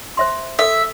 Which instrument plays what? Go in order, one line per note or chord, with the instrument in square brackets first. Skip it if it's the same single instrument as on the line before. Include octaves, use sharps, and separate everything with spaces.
[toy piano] C5 E5 C6
[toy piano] A4 [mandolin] E5